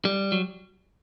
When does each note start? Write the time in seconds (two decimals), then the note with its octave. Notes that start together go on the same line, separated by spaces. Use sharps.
0.05 G3
0.32 F#3